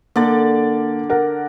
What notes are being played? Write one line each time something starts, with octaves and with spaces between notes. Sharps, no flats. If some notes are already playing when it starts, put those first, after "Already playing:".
D3 A#3 D5
A#4 F#5